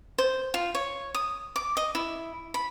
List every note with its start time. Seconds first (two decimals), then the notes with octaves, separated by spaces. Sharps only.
0.18 C5
0.54 F4
0.75 C#5
1.15 D#6
1.56 D6
1.77 D#5
1.95 E4
2.54 B5